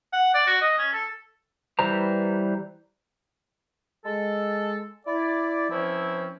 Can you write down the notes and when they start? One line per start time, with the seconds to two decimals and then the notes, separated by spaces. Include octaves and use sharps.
0.13 F#5
0.34 D5
0.47 F#4
0.61 D#5
0.78 C#4
0.93 A4
1.79 E3 G3 B4 C5 A#5
4.05 G#3 A4
5.07 E4 D5
5.70 E3 F3 C4 C#4 E4